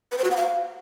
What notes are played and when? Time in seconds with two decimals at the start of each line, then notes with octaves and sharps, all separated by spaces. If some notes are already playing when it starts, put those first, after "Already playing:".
0.12 B4
0.18 C5
0.24 F#4
0.31 F#5
0.37 F5